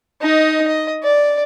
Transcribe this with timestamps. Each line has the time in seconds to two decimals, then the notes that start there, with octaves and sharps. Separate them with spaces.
0.22 D#4 D#5
0.68 D#5
1.03 D5